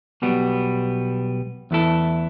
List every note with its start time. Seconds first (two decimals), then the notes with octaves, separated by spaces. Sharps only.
0.22 B1 B2 G3 B3
1.71 E2 E3 A3 E4 A4